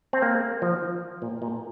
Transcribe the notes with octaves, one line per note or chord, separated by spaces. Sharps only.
C4
A#3
F3
A#2
A#2